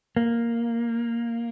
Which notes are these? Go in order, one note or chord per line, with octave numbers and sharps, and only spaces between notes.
A#3